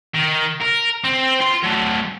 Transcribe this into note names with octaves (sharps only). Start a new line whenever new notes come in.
D#3
A#4
C4
F4 C6
F#3 A3